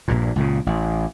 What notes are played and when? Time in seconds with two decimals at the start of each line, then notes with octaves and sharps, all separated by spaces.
0.08 A#1 G2 A#2
0.36 C#2 A#2 C#3
0.66 A1